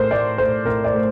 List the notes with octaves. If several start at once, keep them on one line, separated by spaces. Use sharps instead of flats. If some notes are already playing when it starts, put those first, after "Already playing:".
Already playing: A2 A3 A#4 C5
A2 D5
A3 C5
A2 A#4
D5
A3